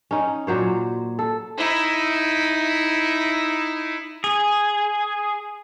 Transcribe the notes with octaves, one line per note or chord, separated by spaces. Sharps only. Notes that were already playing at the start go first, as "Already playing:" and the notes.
C#4 D#4
A#2 F#3 C5 C#5
A4
D#4 E4
G#4